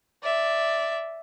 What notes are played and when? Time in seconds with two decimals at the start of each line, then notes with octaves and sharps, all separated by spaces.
0.23 D5 E5